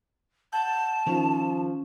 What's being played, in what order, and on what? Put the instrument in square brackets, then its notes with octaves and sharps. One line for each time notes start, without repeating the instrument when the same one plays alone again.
[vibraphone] F#5 [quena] A5 [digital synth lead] G6
[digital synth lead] D#3 [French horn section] F3 [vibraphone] C#4